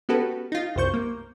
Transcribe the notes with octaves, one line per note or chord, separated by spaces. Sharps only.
B3 C#4 F#4 G4 A4 B4
D#4 F4
C2 F#2 C5 C#6 G6
A#3